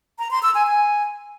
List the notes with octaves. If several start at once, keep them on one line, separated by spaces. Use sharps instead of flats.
A#5
C6
E6
G#5
G#5